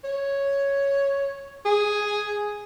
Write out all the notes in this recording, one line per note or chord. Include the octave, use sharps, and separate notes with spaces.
C#5
G#4